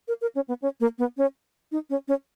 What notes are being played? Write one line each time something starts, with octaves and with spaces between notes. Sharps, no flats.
A#4
A#4
C#4
B3
C#4
A#3
B3
C#4
D#4
C#4
C#4